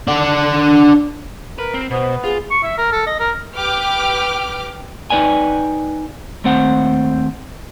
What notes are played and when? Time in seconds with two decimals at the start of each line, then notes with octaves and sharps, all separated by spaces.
0.08 D4 F#5
1.59 A#4 B4
1.74 C4
1.91 B2 B3 C5
2.24 F4 G#4
2.51 C#6
2.63 E5
2.78 A#4
2.92 A4
3.07 D#5
3.20 A#4
3.55 G4 B4 G5 D6 F6
5.10 D#4 F#4 B4 D5 G5 G#5
6.44 D#2 A3 C4 C5 F#5